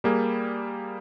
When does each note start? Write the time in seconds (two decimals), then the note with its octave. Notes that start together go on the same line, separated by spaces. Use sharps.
0.04 G3 A#3 G#4